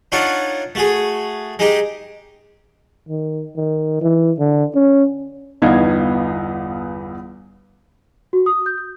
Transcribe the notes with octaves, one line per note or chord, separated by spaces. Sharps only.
D4 D#4 F4 C#5 F#5
A3 F#4 G#4
G#3 D#4 G4
D#3
D#3
E3
D3
C#4
G1 E2 B3 D#4 F5 G#6
F#4
D#6
G6
G6